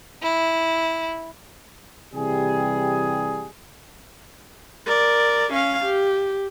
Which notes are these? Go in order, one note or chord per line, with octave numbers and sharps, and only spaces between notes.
E4
C3 E3 G3 G4 G#4
A#4 D5
C#4 F5
G4